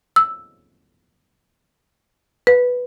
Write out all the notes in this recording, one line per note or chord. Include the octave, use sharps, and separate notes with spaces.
E6
B4